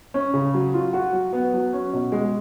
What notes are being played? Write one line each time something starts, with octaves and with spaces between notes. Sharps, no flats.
C#4
C#3
F#3
F4
F#4
F#3
B3
F#3
C#4
B2
G#3